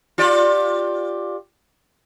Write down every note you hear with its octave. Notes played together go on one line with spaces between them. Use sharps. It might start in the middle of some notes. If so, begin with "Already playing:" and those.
F4 G4 D5